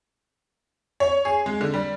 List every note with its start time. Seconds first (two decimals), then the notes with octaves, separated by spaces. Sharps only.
1.00 C#5
1.25 G#4
1.46 G#3
1.61 D3
1.74 G3